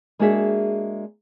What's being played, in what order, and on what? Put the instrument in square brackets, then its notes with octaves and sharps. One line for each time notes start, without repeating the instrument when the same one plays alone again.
[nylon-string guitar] G#3 A#3 D4 F#4 G#4 E5